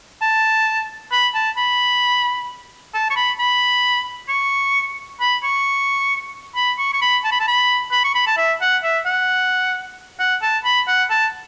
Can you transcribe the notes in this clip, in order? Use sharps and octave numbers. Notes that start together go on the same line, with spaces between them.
A5
B5
A5
B5
A5
C#6
B5
B5
C#6
B5
C#6
B5
C#6
C#6
B5
A5
B5
A5
B5
B5
C#6
B5
A5
E5
F#5
E5
F#5
F#5
A5
B5
F#5
A5